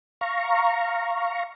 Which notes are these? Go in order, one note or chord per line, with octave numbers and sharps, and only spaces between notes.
F5 A#5 C#6